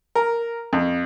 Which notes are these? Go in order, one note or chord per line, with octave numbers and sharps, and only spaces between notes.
A#4
F2